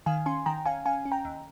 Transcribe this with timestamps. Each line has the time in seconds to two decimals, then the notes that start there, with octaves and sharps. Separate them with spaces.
0.06 D#3 F5 G#5
0.26 C#4 G#5 C6
0.46 D#3 G5 A#5
0.66 C#4 F5 G#5
0.86 C#4 F5 G#5
1.05 C#4
1.12 G5 A#5
1.25 D#2